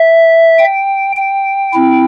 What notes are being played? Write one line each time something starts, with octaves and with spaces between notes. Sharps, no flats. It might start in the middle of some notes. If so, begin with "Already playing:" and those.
Already playing: E5
G5
G5
C4 E4